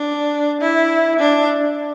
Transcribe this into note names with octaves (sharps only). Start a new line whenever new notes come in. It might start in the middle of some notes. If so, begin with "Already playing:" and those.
Already playing: D4
E4
D4